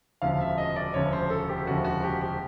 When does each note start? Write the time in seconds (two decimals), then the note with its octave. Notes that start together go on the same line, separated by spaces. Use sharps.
0.22 E1 D2 C#3 F3 F5
0.40 E5
0.58 D#5
0.76 D5
0.94 E1 D2 C#3 F3 C#5
1.12 C5
1.30 A4
1.49 G4
1.67 E1 D2 C#3 F3 F#4
1.84 F#4
2.03 G4
2.21 G4